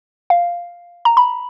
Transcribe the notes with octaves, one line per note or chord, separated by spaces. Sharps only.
F5
A#5
B5